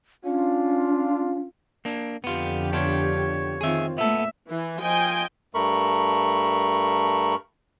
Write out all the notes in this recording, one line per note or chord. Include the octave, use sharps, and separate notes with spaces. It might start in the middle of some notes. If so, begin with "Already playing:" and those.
C#4 D4 F4
A#3 D4
F2 D3 B3 F4 G4
B3 D4 F4 C#5
D#3 C4 F4 G#4 E5
A#2 A3 B3 A4 E5
E3
F3 D#5 G5 G#5
G2 A3 A#4 B5 C#6